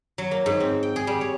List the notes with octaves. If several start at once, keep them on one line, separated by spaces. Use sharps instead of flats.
F#3
A#3
G#2
C4
G5
G#4
G3
C#5